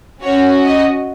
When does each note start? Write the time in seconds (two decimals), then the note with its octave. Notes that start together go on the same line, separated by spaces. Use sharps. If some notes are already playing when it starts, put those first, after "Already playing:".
0.23 C#4 F#4 C#5
0.65 D#5